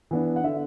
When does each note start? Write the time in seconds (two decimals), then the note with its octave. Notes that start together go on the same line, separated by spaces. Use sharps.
0.11 E3 B3 D4
0.36 F#5
0.44 D3 E5